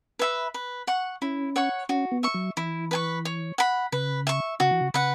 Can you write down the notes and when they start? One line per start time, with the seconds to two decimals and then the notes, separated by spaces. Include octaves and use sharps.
0.19 B4 E5 B5
0.54 B4
0.87 F#5 C#6
1.22 C#4 E4
1.56 C#5 F#5 C#6
1.89 C#4 F#4
2.12 B3
2.23 E5 C#6
2.34 F#3
2.57 E3 E4
2.91 B4 G#5 C#6
3.25 C#5
3.58 F#5 B5
3.92 C#3 B4
4.27 E5 C#6
4.60 C#3 F#4
4.71 E3
4.81 C#3
4.94 C#3 B4 F#5